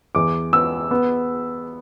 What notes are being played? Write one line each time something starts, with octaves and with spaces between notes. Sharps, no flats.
E2 D6
B3 E6
B3